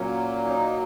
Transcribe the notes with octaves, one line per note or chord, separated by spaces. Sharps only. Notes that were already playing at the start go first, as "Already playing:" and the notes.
Already playing: A#2 F#3 A#3 C#4
D#4